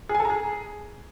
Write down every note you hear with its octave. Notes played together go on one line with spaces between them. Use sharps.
G#4
G#5
A4
A#5
G#4